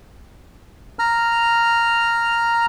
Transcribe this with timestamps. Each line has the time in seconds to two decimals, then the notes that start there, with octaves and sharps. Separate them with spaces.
0.99 A#5 F6